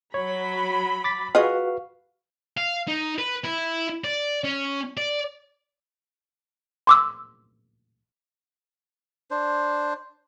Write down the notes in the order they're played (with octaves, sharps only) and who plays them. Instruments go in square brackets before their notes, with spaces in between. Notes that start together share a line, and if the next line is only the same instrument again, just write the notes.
[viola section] F#3 B5 [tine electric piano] C#5
[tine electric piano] D6 A6 B6
[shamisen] F4 G#4 D#5 [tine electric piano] F#4 B4 F5
[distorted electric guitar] F5
D#4
B4
E4
D5
C#4
D5
[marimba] C6 D6 E6
[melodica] D4 C5